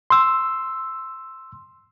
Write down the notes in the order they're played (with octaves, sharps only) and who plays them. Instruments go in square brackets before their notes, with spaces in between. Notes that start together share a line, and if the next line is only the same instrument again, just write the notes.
[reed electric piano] C6 E6